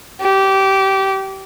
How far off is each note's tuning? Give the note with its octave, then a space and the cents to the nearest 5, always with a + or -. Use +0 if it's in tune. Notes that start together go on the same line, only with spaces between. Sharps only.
G4 -20